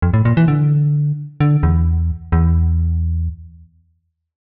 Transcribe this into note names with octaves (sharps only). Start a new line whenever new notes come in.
F2
A2
A#2
E3
D3
D3
E2
E2